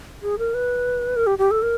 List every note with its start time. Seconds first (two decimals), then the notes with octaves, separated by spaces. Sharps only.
0.23 G#4
0.38 A#4
0.54 B4
1.16 A#4
1.27 G4
1.38 G4
1.51 A4
1.62 A#4